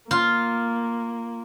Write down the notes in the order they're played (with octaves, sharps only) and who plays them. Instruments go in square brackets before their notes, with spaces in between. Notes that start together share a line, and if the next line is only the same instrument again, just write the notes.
[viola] A#3 [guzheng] F4